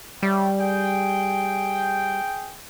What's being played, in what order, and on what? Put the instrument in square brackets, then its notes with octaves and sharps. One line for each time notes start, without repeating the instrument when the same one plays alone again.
[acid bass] G3 [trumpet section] C#5 E5 G5
[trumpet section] G#4 G5